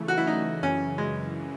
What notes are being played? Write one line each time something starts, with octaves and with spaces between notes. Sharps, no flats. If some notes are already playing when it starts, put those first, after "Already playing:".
Already playing: C#3 E3 A3
F#4
E4
D#4
F#2 C#3 E3 C#4
G#3